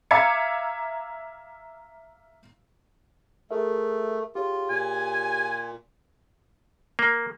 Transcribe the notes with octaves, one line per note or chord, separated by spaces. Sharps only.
E5 F5 A#5 D6 G#6 C#7
A3 G#4 A#4 E5
F4 G4 G#4 C#5
A#2 G#5
A#3